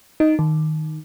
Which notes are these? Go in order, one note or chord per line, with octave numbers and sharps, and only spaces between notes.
D#4
D#3